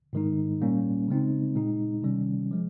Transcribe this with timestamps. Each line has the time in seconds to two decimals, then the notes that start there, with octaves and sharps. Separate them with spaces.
0.13 G#2 D#3 G#3 D#4
0.61 A#2 G3 A#3 C#4
1.08 C#3 G#3 C4 D#4
1.56 A#2 G#3 D#4
2.02 C3 D#3 G3 C#4
2.51 F3 G#3